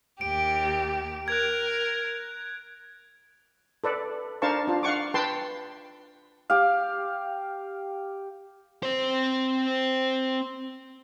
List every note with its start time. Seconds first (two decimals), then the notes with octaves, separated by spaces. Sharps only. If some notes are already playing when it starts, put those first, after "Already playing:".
0.21 D#2 G4 D7
1.28 A#4 F#6 G#6
3.84 A4 B4 D5
4.42 D4 A#4 C5 F5 A5 C#6
4.67 D4 F4
4.83 F5 F#5 C#6 D6
5.14 B4 G5 A5 C6
6.50 G4 F5
8.83 C4 C5